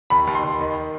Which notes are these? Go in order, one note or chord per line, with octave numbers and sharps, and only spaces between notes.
D#2 B5
D#2
C6
D#2
D#3